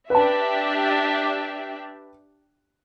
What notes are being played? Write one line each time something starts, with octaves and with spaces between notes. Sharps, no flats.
D4 G4 B4 E5 A5